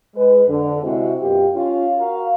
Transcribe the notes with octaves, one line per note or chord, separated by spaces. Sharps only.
G#3 B4
F2 D3
C3 G#3 C4 E4 F#4
F#2 B2 F4 G4
C#4 F4
F#4 A#4 F5